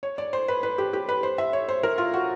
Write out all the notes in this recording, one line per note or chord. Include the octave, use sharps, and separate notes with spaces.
C#5
D5
C5
B4
B4
G4
G4
B4
C5
E5
C#5
C5
A#4
F4
F#4